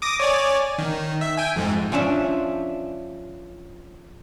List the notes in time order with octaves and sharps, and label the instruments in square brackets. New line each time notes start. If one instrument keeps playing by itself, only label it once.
[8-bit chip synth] D6 D#6 A#6
C#5 D5 G#5
D#3
E5
G5 G#5
F2 G#2
[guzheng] F3 C#4 D4 E5